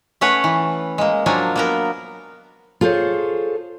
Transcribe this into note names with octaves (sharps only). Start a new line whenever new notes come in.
A3 C#4 B4 C#5 F#5
E3
G#3 A#3
F3 F#3 A#3 D4 G#5
A#3 B3 A#4
F4 G#4 A4 C5 C#5